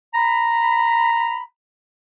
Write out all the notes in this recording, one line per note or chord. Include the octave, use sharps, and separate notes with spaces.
A#5 B5